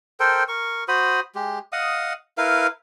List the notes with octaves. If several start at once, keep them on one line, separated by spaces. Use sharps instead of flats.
A4 A#4 C5 G5
A#4 C#6
F#4 C5 B5 D#6
G#3 G4
D#5 F5 F#5 D#6
E4 A#4 B4 F5